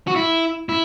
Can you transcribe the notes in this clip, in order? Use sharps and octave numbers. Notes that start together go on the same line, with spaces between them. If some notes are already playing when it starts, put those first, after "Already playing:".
F#4
E4
E4